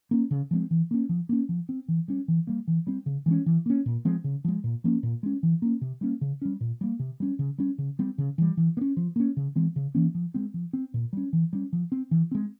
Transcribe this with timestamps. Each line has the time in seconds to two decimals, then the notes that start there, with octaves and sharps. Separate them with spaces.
0.11 A#3 C#4
0.31 C#3
0.51 F3 G#3 C4
0.71 E3
0.91 A#3 C#4
1.09 F3
1.29 A#3 C#4
1.49 F3
1.69 C4
1.88 E3
2.08 G3 C#4
2.28 E3
2.47 G3 A#3
2.68 E3
2.87 G3 C4
3.06 C#3
3.26 E3 G#3 C#4
3.46 E3
3.66 A#3 C#4
3.86 A#2
4.05 F3 G#3 C4
4.24 C#3
4.45 F3 G#3
4.64 A#2
4.84 F3 A#3 C#4
5.03 A#2
5.23 G#3 C#4
5.43 E3
5.62 A#3 C#4
5.81 C3
6.01 G3 A#3 C#4
6.21 C#3
6.42 G3 C#4
6.61 A#2
6.81 G3 A#3
6.99 C3
7.20 G3 C#4
7.39 C#3
7.58 G3 C#4
7.78 C#3
7.99 G3 C4
8.18 C#3
8.38 E3 G3
8.57 E3
8.77 A#3
8.81 C#4
8.97 F3
9.16 A#3 C#4
9.37 C#3
9.56 E3 G#3 C4
9.76 C#3
9.95 E3 A#3 C#4
10.15 F3
10.34 G#3 C4
10.54 F3
10.73 C4
10.94 A#2
11.13 G3 C#4
11.33 E3
11.53 G3 C#4
11.73 F3
11.92 C4
12.11 E3
12.31 G#3 C4